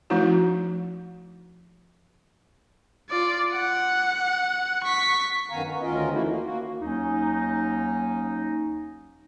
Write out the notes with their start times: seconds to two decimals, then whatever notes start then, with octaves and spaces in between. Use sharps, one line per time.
0.10 F3 A3 C#4 D#4 E4 F#4
3.10 F4 D5
3.54 F#5
4.84 C#6 B6
5.50 F#2 D#3 B3 F5 G#5 A#5
5.64 B3
5.82 D2 D#3 C#4 F4 A#4 D#5
6.12 E3 A3 A#3 D#4 E4 F#4
6.26 A#3
6.44 A#3 F#4
6.82 D#2 F#3 C#4 D#4